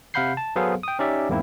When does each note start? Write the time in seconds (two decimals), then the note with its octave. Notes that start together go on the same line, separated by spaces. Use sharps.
0.14 C3 F5 F#5 B5 G6 C7
0.37 A5
0.56 F#3 B3 G#4 A4 C5 F5
0.83 G5 D#6
0.99 C#4 D#4 G4 D5 E5
1.29 E2 G#2 A#3 C4 E4